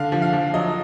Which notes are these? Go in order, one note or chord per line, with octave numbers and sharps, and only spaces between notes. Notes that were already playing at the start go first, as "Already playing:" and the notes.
Already playing: D3 F5
F3
F5
F3
F#3 D#5